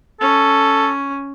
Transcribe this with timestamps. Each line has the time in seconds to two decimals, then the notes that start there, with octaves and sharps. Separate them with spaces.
0.21 C#4 A4